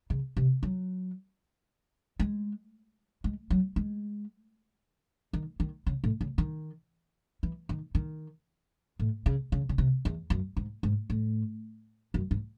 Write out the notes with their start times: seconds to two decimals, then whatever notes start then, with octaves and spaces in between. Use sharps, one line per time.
0.10 C#3
0.37 C3
0.63 F#3
2.20 G#3
3.24 G#3
3.50 F#3
3.76 G#3
5.33 D#3
5.60 D#3
5.87 C#3
6.04 A2
6.21 C#3
6.38 D#3
7.43 E3
7.69 D#3
7.95 D#3
8.99 A2
9.26 C#3
9.52 C#3
9.69 C#3
9.78 C3
10.05 E2
10.30 F#2
10.57 G#2
10.83 G#2
11.10 A2
12.14 F#2
12.31 G#2